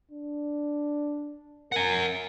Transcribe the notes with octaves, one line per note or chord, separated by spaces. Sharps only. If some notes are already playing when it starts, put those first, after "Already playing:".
D4
A#4 F#5 G#5